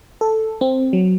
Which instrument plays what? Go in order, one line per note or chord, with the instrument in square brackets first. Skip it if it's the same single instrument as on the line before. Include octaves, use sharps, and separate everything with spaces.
[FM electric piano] A4
C4
F#3